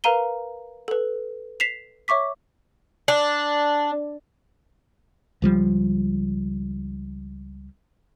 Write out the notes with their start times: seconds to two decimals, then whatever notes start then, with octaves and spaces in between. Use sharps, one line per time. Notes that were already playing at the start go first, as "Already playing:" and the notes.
0.04 A#4 B4 F5 A#5 D#7 G7
0.88 A4 B4
1.60 B6 C7 E7 F7
2.08 C#5 E5 C#6 D6 B6
3.08 D4
5.42 C#2 F3 G3